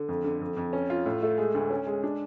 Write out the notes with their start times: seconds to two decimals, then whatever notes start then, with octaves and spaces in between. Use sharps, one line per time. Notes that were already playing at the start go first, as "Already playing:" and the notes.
Already playing: D3
0.08 F2
0.24 D3
0.41 F2
0.57 F2
0.73 C#4
0.90 F4
1.06 A2
1.23 A3
1.38 G#3
1.55 D2
1.70 C#4
1.86 G#3
2.03 D4